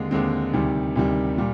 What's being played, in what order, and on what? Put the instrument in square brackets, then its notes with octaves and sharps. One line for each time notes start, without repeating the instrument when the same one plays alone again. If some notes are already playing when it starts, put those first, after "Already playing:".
Already playing: [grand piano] D#2 D3 G#3 C4
D#2 D3 G#3 C4
D2 C3 D#3 G3
D2 C3 D#3 G3
A#2 G3